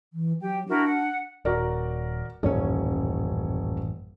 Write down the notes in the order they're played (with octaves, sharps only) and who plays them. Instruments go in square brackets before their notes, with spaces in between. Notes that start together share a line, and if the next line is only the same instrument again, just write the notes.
[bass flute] E3
[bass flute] F#3 [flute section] G4 G5
[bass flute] D4 [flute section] E4 F#4 A#4
[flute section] F#5
[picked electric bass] D#1 [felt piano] F#4 A#4 D5
[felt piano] D#1 C#5 [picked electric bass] A1 F#2 C#4